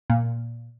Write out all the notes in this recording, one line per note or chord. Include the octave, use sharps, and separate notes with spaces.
A#2